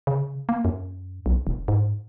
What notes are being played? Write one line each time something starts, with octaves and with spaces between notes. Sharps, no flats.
C#3
A#3
F#2
B1
E1
G#2